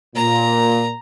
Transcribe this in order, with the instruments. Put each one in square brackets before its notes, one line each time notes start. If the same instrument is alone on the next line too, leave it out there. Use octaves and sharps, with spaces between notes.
[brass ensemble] A#2 [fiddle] A#5